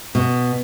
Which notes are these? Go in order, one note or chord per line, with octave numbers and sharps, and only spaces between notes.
B2